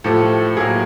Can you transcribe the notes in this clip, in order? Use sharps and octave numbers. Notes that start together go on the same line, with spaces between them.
A2 F3 A3 G4 A4
A2 F#3 A#3 G#4 A#4